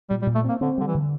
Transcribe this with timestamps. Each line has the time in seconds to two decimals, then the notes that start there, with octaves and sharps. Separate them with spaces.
0.10 A#2 G3
0.22 G3
0.27 A#2
0.35 A3
0.44 A#3 C4
0.61 D3 C4
0.78 D3 G3
0.87 E3
0.95 D3